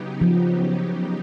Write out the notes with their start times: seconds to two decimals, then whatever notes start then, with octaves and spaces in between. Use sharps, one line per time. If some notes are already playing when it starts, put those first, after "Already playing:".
Already playing: C#3 F#3 B3 D#4 G4
0.21 F3